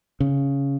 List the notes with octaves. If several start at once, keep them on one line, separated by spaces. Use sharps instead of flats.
C#3